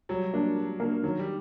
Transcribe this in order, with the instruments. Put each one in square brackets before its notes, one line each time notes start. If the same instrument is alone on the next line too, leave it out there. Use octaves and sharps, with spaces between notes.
[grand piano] F#3 [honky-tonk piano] G3
[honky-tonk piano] A#3 D4
G3
A#3 D4
[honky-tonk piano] D#3 [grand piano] F#3
[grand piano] G3